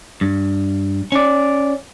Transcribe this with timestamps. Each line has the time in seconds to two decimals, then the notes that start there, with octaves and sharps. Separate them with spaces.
0.21 G2
1.12 C#4 D5